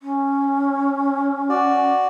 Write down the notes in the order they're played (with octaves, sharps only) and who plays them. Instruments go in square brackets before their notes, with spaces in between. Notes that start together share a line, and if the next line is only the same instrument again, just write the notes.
[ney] C#4
[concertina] F#4 D5